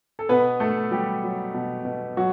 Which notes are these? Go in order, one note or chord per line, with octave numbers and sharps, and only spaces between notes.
A4
B2 B3 B4
A3 A4
F#3 G3 G4
F#3
B2
B2
F#3 F#4